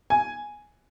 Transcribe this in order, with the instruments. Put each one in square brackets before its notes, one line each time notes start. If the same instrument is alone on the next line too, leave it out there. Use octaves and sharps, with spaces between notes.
[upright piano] G#5